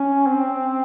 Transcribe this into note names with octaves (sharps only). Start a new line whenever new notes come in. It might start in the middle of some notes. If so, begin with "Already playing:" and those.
Already playing: C#4
C4